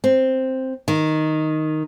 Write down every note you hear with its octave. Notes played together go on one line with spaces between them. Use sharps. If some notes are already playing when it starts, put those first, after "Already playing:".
C4
D#3